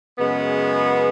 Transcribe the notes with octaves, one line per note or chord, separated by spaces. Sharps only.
F#2 C#3 G#3 B3